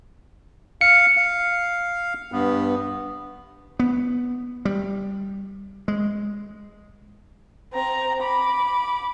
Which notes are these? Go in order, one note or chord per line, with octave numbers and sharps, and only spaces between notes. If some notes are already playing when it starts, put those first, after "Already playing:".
F5 C#7
F5
G2 B3
B3
G3
G#3
C4 A#5
B5 D6